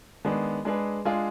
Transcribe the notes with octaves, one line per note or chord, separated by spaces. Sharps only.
D#3 G#3 B3 D4 G#4
G#3 D4 G#4 B4
G#3 D4 F4 G#4